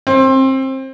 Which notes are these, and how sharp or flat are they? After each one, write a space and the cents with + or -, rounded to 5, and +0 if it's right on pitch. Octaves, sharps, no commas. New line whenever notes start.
C4 +25